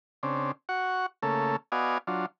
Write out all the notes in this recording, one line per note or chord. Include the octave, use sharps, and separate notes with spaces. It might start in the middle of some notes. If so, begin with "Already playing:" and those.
C#3 C4 D4
F#4 F#5 C#6
C#3 A3 A#3 A4
B3 F#4 D5 D#5 F5 G#5
F#3 D4 F4